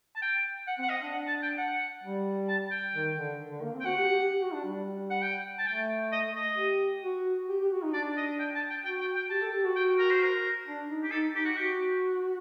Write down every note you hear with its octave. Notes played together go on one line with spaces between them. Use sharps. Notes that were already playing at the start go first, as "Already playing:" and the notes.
A5
G5
F#5
C4
F#5
D#5
D4
F#5
A5
G5
F#5
G3
A5
G5
D#3
D3
D3
A#3
C4
G5
F#4 F#5
G4
G4
G4
G4
F#4
D4
G3
F#5
G5
A5
A3 G5
D#5
D#5
G4
F#4
G4
G4
F#4
D#4
D4 D5
D#5
G5
A5
G5
F#4 G5
G5
G5
G4 A5
A4
G4
F#4
G5
A#4
C5
A#4
D4
D#4
G4
D#4 A4
D#4 G4
F#4
F#4 G4